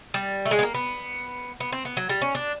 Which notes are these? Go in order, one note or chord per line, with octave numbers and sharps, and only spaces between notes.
G3
A3
G#3
B3
A#3
B3
B3
C4
B3
F#3
G3
C#4
D4